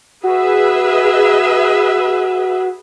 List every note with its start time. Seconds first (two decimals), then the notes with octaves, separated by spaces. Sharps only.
0.24 F#4 G#4 B4 E5